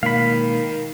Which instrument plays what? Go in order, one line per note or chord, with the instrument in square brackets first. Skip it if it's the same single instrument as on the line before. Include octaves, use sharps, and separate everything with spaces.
[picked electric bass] B2 G#3 A#3 [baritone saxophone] D#3 [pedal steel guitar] F5 B5